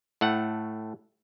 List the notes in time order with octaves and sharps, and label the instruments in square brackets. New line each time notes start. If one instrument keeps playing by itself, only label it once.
[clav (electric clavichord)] A2 A3 F#5